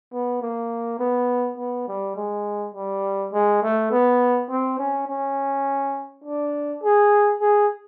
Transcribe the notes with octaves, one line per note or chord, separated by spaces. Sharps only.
B3
A#3
B3
B3
G3
G#3
G3
G#3
A3
B3
C4
C#4
C#4
D4
G#4
G#4